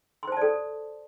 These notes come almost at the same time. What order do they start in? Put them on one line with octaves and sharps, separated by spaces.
C6 C5 A5 D5 A4